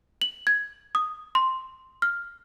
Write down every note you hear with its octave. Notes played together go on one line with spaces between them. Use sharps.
F#7
G#6
D#6
C6
F6